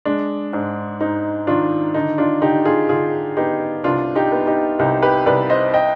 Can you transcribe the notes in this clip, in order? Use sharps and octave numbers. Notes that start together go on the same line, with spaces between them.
G#3 D4
G#2 D4
G#2 D#4
D#3 D4 F4
D3 D#4
D4 F4
D3 D#4 G4
F4 G#4
D3 F4 G#4
B3 D#4 G4
C2 D4 F4
D#4 G4
B3
D#4 G4
C2 D#4 G4
G4 B4
C2 B4 D5
C5 D#5
D#5 G5